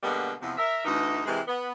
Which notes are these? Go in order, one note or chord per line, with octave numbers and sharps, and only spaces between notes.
B2 D3 G3 G#3 A#3 B3
E2 C3 F3
A#4 E5
D2 E3 D#4
C3 E3 G#3
B3